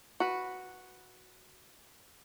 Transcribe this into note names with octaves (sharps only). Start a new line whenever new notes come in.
F#4 B4